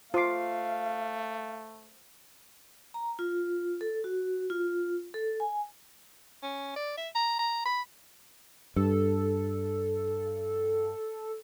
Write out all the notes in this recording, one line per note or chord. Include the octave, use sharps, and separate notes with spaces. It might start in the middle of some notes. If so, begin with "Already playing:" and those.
A3 F4 C5 F5 D6 C7
A#5
F4
A4
F#4
F4
A4
G#5
C#4
D5
E5
A#5
A#5
B5
G2 A4